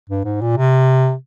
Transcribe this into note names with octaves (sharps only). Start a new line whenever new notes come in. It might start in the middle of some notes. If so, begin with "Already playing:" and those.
G2
G#2
A#2
C3